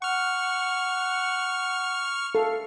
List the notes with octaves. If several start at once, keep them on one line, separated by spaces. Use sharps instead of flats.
F#5 C#6 F6
A4 F5